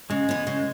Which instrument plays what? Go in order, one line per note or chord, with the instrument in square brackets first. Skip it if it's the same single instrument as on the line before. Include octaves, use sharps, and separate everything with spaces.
[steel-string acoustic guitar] C#3 [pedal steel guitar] G#3
[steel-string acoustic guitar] E3 B3
C#3